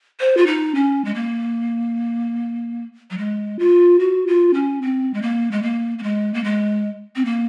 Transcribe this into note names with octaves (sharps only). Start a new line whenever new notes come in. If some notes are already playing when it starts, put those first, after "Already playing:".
C5
F4
D#4
C#4
G#3
A#3
F#3
G#3
F4
F#4
F4
C#4
C4
G#3
A#3
G#3
A#3
A#3
G#3
A#3
G#3
C4
A#3